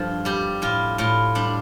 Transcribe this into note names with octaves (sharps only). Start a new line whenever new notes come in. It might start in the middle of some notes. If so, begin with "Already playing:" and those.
Already playing: G2 F3 D4 A4
G3 G4
A2 F4
A2 F4
G3 D4